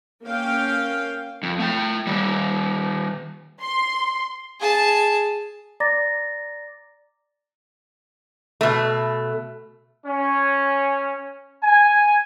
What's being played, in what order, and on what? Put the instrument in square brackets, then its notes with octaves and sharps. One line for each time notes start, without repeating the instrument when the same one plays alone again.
[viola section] A#3 C#4 F5 G5
[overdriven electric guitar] F2
A3 G5
D#3 G3
[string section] C6
[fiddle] G#4 A5
[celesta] D5 A#5 D6 A6 A#6
[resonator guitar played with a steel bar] B2 A3
[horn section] C#4
G#5